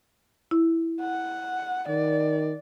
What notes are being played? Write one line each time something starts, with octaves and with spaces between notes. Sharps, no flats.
E4
F#5
D#3 D5